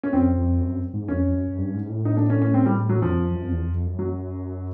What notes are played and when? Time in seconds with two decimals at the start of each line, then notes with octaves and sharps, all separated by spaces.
0.03 C#4
0.13 F2 C4
0.37 F2
0.61 F#2
0.93 G#2
1.08 F2 C#4
1.26 F2
1.33 F#2
1.48 F#2
1.58 G2
1.74 G#2
1.89 A2
2.05 D#4
2.17 D4
2.30 C#4
2.42 C#4
2.54 C4
2.66 G3
2.89 F#3
3.02 F2 F3
3.18 F2
3.31 F2
3.34 F#2
3.44 F2
3.51 E2
3.63 F2
3.74 F2
3.86 F#2
3.99 F#3